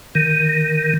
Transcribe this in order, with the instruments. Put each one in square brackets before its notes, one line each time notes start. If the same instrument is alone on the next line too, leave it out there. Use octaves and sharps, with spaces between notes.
[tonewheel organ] D#3